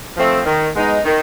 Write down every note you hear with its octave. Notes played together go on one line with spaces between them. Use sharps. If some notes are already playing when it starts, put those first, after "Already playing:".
F3 A3 C4
D#3
G#3 B3 D#4
D#3